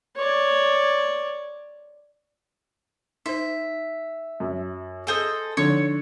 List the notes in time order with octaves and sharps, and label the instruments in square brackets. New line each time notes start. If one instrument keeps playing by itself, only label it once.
[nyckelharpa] C#5 D5
[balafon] D#4 C5 [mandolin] E5
[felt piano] F#2
[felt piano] G#4 [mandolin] A4 C5 D#5
[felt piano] D3 [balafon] F3 D4 D#4 [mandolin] C#5